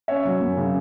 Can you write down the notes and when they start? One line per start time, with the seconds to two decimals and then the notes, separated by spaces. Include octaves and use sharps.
0.08 C#4 C#5 E5
0.25 F#3
0.41 F#2
0.57 C#3